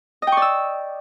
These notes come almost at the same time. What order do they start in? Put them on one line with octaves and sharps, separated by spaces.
D#5 G5 C#6 D5 E6